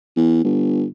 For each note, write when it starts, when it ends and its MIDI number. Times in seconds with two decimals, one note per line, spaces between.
0.17 0.44 40
0.44 0.84 31